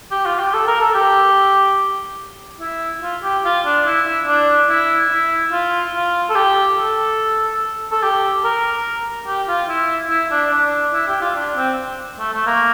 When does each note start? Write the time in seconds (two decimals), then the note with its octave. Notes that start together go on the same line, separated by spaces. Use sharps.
0.11 G4
0.25 F4
0.39 G4
0.53 A4
0.67 A#4
0.81 A4
0.94 G4
2.60 E4
3.02 F4
3.23 G4
3.45 F4
3.65 D4
3.86 E4
4.07 E4
4.27 D4
4.69 E4
5.10 E4
5.52 F4
5.94 F4
6.29 A4
6.35 G4
6.77 A4
7.91 A4
8.03 G4
8.44 A#4
9.27 G4
9.48 F4
9.69 E4
10.10 E4
10.31 D4
10.52 D4
10.94 E4
11.07 G4
11.21 F4
11.36 D4
11.56 C4
12.19 A3
12.33 A3
12.46 A#3